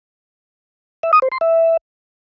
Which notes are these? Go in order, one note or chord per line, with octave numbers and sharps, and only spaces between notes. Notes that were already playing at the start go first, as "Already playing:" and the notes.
E5
D#6
C5
C6
E5